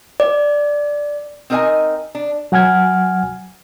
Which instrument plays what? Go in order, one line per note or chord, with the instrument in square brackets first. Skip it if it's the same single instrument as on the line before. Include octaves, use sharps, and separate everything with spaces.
[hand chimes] D5
[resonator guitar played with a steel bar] C4 D#4 A#4 D5 D#5 G#5
D4
[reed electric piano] F#3 F#5 G#5 F6 G#6